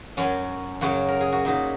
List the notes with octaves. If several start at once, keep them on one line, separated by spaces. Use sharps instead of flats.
F#2 F#3 C#4
F#2 C#3 F#3 F#4
A#4
G#4
F#4
A#2 F#3 D#4